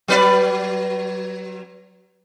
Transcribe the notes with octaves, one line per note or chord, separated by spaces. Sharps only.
F#3 B4 D5